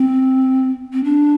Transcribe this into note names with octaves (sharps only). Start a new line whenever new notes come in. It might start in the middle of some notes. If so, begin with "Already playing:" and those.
Already playing: C4
C4
D4